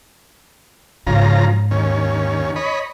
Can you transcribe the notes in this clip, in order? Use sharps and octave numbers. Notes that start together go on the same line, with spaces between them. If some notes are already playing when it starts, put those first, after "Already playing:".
G#2 C#3 F3 A#5
D#2 C#4
C#5 D#5 B5